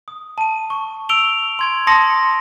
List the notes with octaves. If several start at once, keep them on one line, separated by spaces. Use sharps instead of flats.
D#6
A5 D#7
C#6
E6 D7 F7 G7
C6 G#6 D7
A5 C6 D#6 A#6 C#7